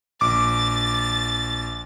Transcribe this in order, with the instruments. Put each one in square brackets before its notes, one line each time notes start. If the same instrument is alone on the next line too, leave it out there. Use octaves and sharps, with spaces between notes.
[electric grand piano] A#1 [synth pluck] D6 [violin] A6